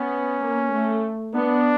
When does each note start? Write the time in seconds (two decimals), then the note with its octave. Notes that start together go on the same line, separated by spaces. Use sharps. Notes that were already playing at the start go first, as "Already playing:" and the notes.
Already playing: B3 C#4
0.41 A#3
0.73 A3
1.35 B3 D4